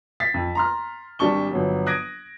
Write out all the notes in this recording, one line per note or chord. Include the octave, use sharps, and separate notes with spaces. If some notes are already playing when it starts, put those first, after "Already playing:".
A6 B6 C7
F2
A#5 C6 F6
G#1 G3 D4 A5 C#6 G7
G1 F3 F#3
D#6 F#6 G#6 A#6 D7